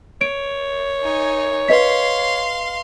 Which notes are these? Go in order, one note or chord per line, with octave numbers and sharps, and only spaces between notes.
C#5 D7
D#4 G#5
B4 D#5 F5 C6 B6